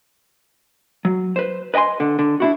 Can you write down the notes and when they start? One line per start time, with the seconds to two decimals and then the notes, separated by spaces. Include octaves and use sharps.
1.05 F#3
1.36 B4 C5
1.74 B4 D#5 G5 G#5 C6
2.00 D3
2.19 D3
2.40 D4 E4 F#4